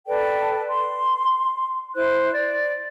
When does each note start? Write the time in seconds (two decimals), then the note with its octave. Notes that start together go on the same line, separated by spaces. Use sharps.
0.06 A4 B4 D5 G5
0.68 C6
1.95 E4 C5 F#6
2.33 D5